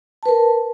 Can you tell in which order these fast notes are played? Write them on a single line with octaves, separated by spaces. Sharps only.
A5 B4 A#4